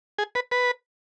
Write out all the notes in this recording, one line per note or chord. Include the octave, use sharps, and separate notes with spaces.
G#4
B4
B4